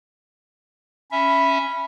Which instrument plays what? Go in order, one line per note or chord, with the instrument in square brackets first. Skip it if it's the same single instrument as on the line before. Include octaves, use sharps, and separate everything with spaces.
[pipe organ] C#4 E5 [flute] B5